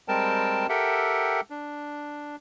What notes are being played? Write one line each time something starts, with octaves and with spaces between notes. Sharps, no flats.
G3 G#3 C4 A#4 G5 A5
G4 A4 A#4 E5 F#5 G5
D4